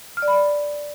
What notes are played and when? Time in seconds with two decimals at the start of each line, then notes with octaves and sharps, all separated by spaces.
0.17 F6
0.22 D5
0.28 B5
0.33 D5